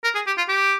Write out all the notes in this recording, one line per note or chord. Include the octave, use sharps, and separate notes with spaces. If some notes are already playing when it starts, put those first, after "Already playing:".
A#4
G#4
G4
F4
G4